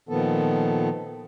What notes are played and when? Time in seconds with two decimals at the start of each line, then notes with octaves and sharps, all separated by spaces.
0.09 A#2 D#3 F3 B3 A4